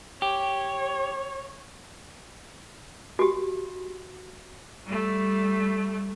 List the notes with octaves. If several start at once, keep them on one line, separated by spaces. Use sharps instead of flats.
G4 C#5
F#4 G4
G3 A3